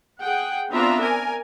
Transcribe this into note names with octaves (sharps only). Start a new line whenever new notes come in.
G#4 F#5 G5
B3 C4 D4 F4 E5 A#5
A#4 G#5